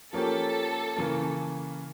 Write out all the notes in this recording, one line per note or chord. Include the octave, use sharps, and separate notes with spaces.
F3 A#3 C#4 G4 A4
C#3 E3 A#3